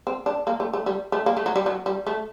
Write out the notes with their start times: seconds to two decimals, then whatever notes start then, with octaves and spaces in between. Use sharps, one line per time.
0.07 C4
0.26 D4
0.47 A#3
0.60 A3
0.73 A3
0.86 G3
1.12 A3
1.26 A#3
1.37 A3
1.46 F#3
1.56 G3
1.66 F#3
1.86 G3
2.07 A3